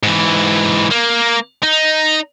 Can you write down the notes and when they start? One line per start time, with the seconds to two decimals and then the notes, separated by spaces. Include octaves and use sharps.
0.03 G#2 E3
0.91 A#3
1.63 D#4